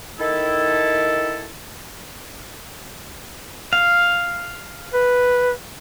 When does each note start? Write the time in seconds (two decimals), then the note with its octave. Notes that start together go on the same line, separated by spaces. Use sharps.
0.19 D#3 E4 A4
3.73 F5
4.94 B4